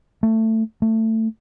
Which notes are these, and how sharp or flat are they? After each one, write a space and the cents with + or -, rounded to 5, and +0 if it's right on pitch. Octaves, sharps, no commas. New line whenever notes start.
A3 +15
A3 +20